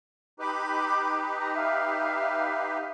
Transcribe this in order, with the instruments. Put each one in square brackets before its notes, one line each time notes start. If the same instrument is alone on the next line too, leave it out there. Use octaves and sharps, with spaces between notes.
[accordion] D#4 G4 B4 [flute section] B5 D6
[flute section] A5 A#5
E5 F5